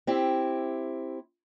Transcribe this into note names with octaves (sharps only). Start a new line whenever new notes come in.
C4 E4 G4